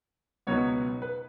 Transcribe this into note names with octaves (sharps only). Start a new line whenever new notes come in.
C#2 B2 F#3 B3 D#4 C#5
B4